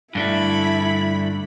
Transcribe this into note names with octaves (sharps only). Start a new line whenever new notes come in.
G2 D3 A3 E4 B5